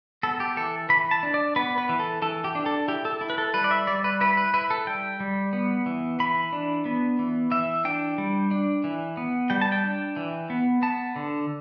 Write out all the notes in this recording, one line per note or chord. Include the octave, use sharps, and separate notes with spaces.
B3 A4
G4
E3 A4
E3 B5
A5
D4
D5
B3 B4
B4
E3
A4
E3 A4
G4
D4
A4
E4 G4
A4
E4
B4
A4
G3 B4
D5
E5
G3 D5
B4
E4 B4
B4
E4 B4
A4
G3 G5
G3
B3
E3
E3 B5
D4
B3
E3
E3 E5
D4 G5
G3
D4
E3
B3
G3 G5
A5
G5
D4
E3
B3
B3 A5
D3